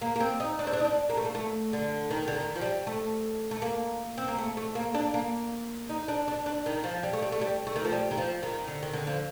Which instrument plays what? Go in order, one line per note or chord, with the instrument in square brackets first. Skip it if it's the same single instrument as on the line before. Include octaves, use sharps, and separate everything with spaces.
[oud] A#3
A#3
C4
D#4
D4
C4
D4
D#4
D4
A#3
A3
A#3
A3
D3
D#3
D3
D#3
F3
G3
A3
A3
A#3
C4
A#3
A3
A3
A#3
D4
A#3
D#4
D4
D4
D4
D#3
F3
G3
A3
G3
A3
G3
A3
D#3
F3
G3
D#3
F3
D#3
D3
D#3
D3
F3